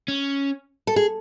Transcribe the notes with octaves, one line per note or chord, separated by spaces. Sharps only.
C#4
A4
G#4